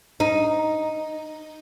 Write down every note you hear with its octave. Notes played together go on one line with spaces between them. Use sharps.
D#4